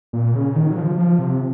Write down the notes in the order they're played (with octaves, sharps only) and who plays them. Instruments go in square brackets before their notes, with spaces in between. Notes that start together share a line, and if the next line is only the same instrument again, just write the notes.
[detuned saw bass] A#2
C#3
D#3
F#3
F3
F3
C3